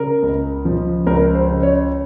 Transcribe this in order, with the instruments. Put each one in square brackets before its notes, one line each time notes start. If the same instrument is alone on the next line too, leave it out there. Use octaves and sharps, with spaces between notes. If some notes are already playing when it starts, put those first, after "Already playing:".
Already playing: [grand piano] C#3 A#4
C#2
F3
C#2 A#4
C5
C#3
C#5